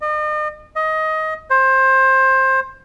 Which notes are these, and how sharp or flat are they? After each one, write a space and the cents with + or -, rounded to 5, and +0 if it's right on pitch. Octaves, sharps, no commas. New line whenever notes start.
D#5 -40
D#5 +20
C5 +20